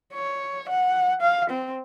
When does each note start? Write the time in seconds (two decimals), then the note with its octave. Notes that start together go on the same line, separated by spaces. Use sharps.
0.14 C#5
0.69 F#5
1.21 F5
1.50 C4